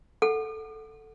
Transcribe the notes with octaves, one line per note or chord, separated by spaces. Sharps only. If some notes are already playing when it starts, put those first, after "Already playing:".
A4 F#5